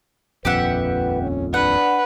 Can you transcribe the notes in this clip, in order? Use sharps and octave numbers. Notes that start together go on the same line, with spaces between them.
D#1 A#1 F2 G4 B4 E5 F#5
C#4
D4 B4 F#5